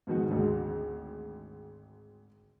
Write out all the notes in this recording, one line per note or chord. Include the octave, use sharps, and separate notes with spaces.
G#2 B2 D#3 F#4
G#1 D2 G#3